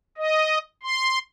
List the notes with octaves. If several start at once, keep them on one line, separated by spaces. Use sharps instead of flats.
D#5
C6